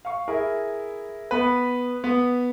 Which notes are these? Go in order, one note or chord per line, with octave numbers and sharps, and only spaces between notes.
F5 C#6
E4 G#4 A#4
B3 B4
B3